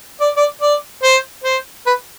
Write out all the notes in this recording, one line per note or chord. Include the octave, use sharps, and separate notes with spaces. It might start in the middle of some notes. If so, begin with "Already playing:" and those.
D5
D5
D5
C5
C5
B4